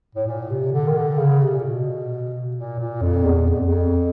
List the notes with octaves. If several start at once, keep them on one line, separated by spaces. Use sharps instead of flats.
A2
A#2
C3
D3
D#3
D3
C#3
C3
A#2
B2
A#2
A#2
F2
E2
F2
E2
F2